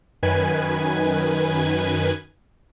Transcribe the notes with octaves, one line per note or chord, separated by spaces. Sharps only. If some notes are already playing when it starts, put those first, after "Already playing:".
F#2 D#3 B4 G#5 G#6